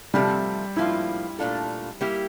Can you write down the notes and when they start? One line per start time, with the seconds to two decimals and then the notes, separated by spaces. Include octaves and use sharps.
0.14 C3 F3 G3 A3 C4
0.76 A2 F3 A#3 E4 F4
1.39 A#2 A3 D4 F4 A4
2.01 G3 A#3 E4 G4